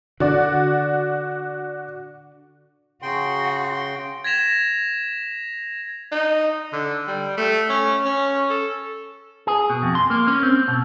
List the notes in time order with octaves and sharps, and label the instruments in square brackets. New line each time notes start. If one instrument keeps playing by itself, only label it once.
[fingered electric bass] D3 [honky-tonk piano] F#4 D5
[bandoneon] C#3 G5 C6 [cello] F#4
[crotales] G#6 A#6 B6 E7 F7
[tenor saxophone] D#4
D3
G3
A3
C#4
C#4
A4
[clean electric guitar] G#4
B2
F2
C6
A#3
C#4
C4
B2